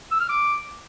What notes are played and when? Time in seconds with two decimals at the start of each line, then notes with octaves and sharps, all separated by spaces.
0.11 E6
0.20 F6
0.29 D6